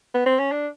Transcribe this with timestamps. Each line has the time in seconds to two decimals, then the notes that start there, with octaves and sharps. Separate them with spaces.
0.14 B3
0.26 C4
0.39 C#4
0.52 D4